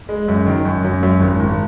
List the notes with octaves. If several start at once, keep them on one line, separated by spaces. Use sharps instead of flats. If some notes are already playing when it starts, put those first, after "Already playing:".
G#3
F#2
D#3
F#2
F#2
F#2
G#1
G#1